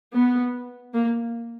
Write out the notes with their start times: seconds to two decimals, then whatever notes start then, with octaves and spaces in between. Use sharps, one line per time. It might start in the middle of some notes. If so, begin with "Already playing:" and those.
0.15 B3
0.94 A#3